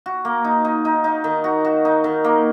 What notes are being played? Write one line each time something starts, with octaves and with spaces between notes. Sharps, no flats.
F#4
A#3
D#4
D#4
D#4
D#4
D#3
F#4
F#4
D#4
D#3
A#3